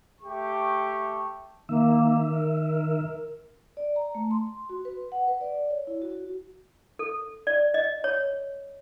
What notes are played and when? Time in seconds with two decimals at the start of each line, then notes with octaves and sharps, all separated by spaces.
0.21 A3 G4 C#6
1.69 D#3 A#3 E5
2.29 A#4
3.77 D5
3.96 A#5
4.15 A3
4.31 C6
4.69 F#4
4.85 B4
5.12 F#5
5.28 B4
5.41 D5
5.71 C#5
5.87 E4
6.02 F#4
6.99 A4
7.47 D5
7.74 D#5
8.04 C#5